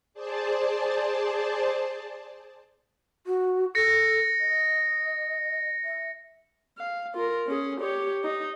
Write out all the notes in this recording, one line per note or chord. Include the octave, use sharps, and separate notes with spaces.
G#4 C5 D5 A5
F#4
A4 A#6 C#7
D#5
E5
F5
F4 A#4
C#4 G#4
G4 C#5
D#4